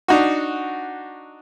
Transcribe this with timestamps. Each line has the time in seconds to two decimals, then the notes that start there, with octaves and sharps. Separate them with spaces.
0.08 D4 D#4 F#4